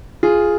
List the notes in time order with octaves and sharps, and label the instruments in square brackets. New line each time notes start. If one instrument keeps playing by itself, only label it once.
[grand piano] F4 G#4